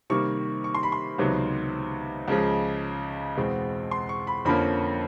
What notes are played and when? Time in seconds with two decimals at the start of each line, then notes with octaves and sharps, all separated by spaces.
0.10 C3 D#3 G3 A#3 C#6
0.64 C#6
0.75 C6
0.83 B5
0.92 C6
1.18 C#2 C3 D#3 F#3 B3
2.28 C#2 C#3 F3 G#3
3.37 E2 B2 G#3 C4
3.91 C6
4.09 C#6
4.27 B5
4.45 F2 D3 F3 A#3 C#4 B5